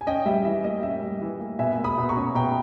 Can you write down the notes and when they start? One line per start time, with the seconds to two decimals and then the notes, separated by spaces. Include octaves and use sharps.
0.01 G#5
0.07 C#4 D#5 G5
0.26 G3 E5
0.45 E3 E5
0.64 A#3 D#5
0.83 C#4 E5
1.02 G3
1.21 E3
1.40 A#3
1.59 B2 E5 G#5
1.78 A#3
1.84 B5 D#6
1.98 B2
2.09 A#5 C#6
2.16 C#4
2.35 B2 G5 A#5